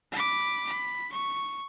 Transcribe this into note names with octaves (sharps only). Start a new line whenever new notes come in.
B5 D6
B5
C#6